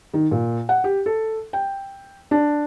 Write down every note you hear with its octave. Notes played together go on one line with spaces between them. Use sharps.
D#3
A#2
F#5
G4
A4
G5
D4